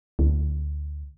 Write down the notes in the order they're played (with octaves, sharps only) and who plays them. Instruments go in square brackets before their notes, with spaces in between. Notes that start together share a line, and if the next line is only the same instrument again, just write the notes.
[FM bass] D2